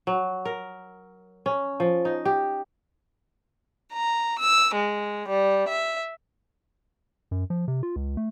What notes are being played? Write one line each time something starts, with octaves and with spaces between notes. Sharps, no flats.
F#3
A#4
C#4
F3
D#4
G4
A#5
E6
G#3
G3
E5
F#2
F3
C3
F4
C#2
A3